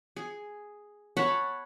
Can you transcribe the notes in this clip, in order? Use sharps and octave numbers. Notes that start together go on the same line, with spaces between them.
G#4
C#5 F#5 A5 B5